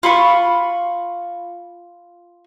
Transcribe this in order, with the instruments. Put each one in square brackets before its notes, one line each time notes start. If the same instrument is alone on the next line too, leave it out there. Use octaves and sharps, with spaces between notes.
[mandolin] F4 B5 C#6